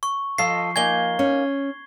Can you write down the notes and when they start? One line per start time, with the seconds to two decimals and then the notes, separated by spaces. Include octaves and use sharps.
0.03 C#6
0.38 F3 F4 A4 D#5 C7
0.76 A#3 D#4 G#5 G#6 G7
1.19 C#4